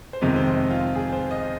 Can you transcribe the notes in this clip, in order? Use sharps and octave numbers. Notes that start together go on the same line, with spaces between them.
C5
F2 C3 D#3 G#3 D#5
C5
D#5
F4
G#4
C5
D#5